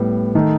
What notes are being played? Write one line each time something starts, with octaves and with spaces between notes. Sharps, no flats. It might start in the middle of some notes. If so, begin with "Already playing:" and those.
Already playing: A2 G3 B3
D#3 A3 D#4